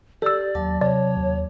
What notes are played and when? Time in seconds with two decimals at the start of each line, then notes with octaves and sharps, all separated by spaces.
0.22 G4 A4 D5 E6
0.55 D#2 F#3 A5 D6
0.81 C3 C#5 D5
1.16 D#2